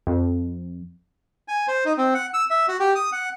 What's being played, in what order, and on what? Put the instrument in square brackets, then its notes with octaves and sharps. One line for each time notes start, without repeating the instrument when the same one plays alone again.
[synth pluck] F2
[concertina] G#5
C5
D#4
C4
F#5
E6
E5
F#4
G4
D#6
F#5